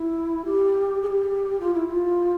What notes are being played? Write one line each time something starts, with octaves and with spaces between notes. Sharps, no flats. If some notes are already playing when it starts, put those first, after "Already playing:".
Already playing: E4
G4
G#4
G4
F4
E4
F4